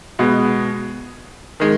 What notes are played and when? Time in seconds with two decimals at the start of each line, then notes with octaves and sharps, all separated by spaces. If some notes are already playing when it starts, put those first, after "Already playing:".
0.19 B2 G#3 B3
1.60 D#3 G#3